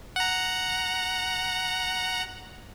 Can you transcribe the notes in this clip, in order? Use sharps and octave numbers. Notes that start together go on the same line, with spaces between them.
F#5 A#5